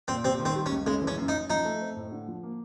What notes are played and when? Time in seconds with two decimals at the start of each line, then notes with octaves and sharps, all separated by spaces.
0.08 A#2 C4
0.24 C3 C4
0.40 D#3
0.45 C4
0.55 G3
0.66 C#4
0.71 C#2
0.86 C#3 G#3
1.02 E3
1.07 C#4
1.17 F#2
1.28 D#4
1.34 F#2
1.49 F3 D#4
1.65 A3
1.81 C4
1.96 A2
2.12 D3
2.28 F3
2.43 A#3